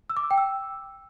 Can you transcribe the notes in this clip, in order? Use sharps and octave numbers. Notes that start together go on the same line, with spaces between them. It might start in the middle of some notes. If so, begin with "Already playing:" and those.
E6
D6
E6
G5
E6